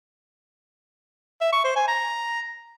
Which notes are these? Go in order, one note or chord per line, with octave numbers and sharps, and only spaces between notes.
E5
C#6
C5
G#5
A#5